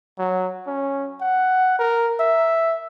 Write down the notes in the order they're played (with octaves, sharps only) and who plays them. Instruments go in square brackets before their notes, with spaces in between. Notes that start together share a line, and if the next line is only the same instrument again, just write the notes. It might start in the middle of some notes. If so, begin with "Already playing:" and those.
[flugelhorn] F#3
C#4
F#5
A#4
E5